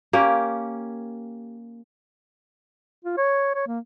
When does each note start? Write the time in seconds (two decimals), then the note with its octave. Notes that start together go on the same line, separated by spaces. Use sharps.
0.13 A#3 C#4 G4
3.05 F4
3.17 C#5
3.55 C#5
3.67 A#3